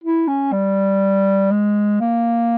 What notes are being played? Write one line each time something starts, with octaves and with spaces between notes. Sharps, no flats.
E4
C#4
G3
G#3
A#3